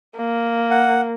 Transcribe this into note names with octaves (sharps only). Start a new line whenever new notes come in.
A#3
F#5